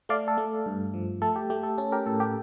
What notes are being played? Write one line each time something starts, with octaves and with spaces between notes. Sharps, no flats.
A3 D5 F5
A4
A3
G2
F3
A3 A4
G4
A3 G4
A4
C#4 A4
G4 A#4
A2 A4
G4